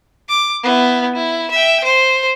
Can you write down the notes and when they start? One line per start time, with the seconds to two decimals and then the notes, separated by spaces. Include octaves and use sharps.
0.29 D6
0.63 B3 E4
1.15 E4
1.51 E5 G5
1.84 C5